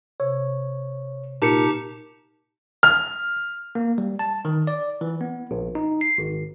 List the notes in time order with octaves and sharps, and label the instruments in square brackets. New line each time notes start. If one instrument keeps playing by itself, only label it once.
[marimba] C3 [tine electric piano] C#5
[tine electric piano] A#2 A#4 C#7 [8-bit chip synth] D#4 G4 A5
[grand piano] F6
[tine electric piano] A#3
G3
A5
D#3
D5
E3
B3
A#1
D#4
C7
G#1